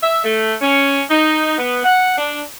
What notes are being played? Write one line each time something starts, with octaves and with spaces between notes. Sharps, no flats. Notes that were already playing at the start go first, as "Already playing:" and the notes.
E5
A3
C#4
D#4
B3
F#5
D4